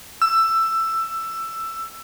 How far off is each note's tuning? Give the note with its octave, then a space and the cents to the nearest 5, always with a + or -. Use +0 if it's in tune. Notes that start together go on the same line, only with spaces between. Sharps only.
E6 +10